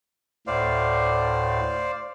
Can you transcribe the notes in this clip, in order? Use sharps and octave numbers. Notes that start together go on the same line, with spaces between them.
D2 A2 C5 D5 F5